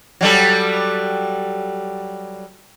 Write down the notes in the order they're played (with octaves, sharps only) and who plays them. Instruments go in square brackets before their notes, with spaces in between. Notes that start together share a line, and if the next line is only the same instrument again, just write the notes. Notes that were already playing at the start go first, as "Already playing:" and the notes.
[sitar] F#3 G3 A4